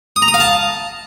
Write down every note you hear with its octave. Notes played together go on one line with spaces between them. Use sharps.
D#6
A#5
D#6
F5
A5